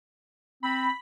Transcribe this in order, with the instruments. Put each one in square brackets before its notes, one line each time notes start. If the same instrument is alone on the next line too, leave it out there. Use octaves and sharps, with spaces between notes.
[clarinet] C4 [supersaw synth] B5